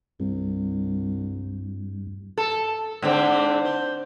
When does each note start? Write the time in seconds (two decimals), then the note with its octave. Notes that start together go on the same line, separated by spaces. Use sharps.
0.20 C2 G2
2.38 A4
3.02 G#2 D3 C4
3.65 C5